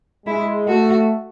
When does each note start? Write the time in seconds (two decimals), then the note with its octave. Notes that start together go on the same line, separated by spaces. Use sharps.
0.26 G#3 E4
0.68 A3 F#4